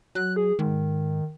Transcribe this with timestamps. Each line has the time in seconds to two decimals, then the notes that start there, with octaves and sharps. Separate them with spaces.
0.15 F#3 F#6
0.36 G#4
0.59 G#2 D#3